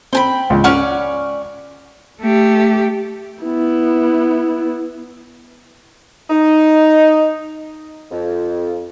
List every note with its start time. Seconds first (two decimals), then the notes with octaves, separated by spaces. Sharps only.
0.13 C4 G5 G#5 B5
0.50 C#2
0.64 C#4 D5 F#5 C#6 F6
2.22 A3 G4
3.44 B3 E4
6.30 D#4
8.11 F2